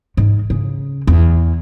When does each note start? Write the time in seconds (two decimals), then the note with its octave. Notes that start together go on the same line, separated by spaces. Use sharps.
0.17 G#2
0.50 C#3
1.07 E2